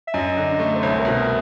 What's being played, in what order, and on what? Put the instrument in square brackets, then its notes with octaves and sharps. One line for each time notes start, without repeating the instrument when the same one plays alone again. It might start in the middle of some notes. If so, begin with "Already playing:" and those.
[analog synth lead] E5
[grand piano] F#2 [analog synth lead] D#5
[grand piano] D3
A3
[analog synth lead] C5
[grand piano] C2 [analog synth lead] C#5
[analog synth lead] A#4
[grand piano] B2
[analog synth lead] A#4